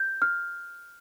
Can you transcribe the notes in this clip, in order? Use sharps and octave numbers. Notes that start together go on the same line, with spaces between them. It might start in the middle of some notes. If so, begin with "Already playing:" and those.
Already playing: G6
F6